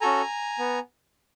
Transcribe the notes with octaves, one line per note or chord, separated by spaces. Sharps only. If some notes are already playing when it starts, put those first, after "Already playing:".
C#4 F#4 A4 G#5 A#5
B3